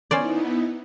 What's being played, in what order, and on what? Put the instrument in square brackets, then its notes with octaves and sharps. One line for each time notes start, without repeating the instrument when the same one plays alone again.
[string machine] B3 D#4 E4 [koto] C#4 C5 D5